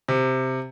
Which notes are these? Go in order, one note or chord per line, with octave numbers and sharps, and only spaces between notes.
C3